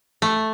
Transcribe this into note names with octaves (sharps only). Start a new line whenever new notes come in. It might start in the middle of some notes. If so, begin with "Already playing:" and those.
A3